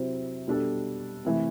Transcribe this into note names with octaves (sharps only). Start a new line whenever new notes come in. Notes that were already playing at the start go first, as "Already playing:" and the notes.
Already playing: C3 F#3 C4 E4
B2 G3 D4 A4
C3 E3 A3